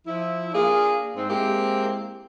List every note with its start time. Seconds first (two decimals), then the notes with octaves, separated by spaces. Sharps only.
0.07 F3 E4
0.54 A#3 D4 F4 G#4
1.16 G#2 C4
1.29 G#3 A#3 C4 E4 G4